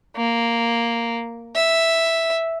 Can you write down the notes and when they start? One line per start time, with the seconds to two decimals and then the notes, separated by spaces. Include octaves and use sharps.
0.16 A#3
1.55 E5